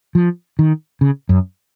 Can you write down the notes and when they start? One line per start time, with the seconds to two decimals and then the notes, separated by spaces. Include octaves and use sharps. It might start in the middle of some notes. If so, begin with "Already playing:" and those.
0.15 F3
0.59 D#3
1.01 C#3
1.29 F#2